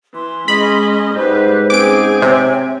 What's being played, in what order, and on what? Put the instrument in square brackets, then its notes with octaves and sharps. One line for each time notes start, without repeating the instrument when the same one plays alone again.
[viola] E3 [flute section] C6
[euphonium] G#3 [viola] C#4 D#5 [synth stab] B5
[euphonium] G#2 [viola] G3 B4 [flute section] C5 G6
[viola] C4 G#5 [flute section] C#4 G#4 B4 [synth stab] D6 D7
[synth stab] C3 [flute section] C#5 G5